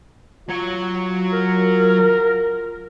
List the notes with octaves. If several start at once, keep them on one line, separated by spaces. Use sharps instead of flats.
F#3 F4 C#5
A#4